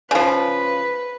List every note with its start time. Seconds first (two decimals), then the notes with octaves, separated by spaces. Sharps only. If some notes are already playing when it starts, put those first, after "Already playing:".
0.11 C#3 F3 B4